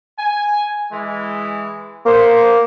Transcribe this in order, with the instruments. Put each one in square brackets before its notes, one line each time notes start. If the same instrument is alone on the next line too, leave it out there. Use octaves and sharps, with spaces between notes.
[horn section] G#5
E3 G#3
[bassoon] A#3 [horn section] B3 F4 C5